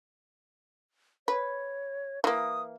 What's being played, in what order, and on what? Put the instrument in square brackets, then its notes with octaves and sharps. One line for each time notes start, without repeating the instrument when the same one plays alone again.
[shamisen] B4 [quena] C#5
[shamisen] E3 A#3 [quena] D#6